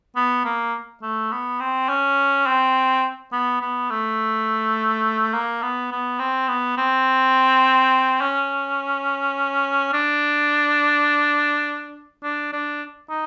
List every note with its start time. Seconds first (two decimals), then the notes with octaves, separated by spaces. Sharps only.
0.16 B3
0.45 A#3
1.02 A3
1.31 B3
1.60 C4
1.88 C#4
2.47 C4
3.32 B3
3.61 B3
3.90 A3
5.34 A#3
5.62 B3
5.91 B3
6.19 C4
6.48 B3
6.77 C4
8.21 C#4
9.93 D4
12.23 D4
12.52 D4
13.09 D#4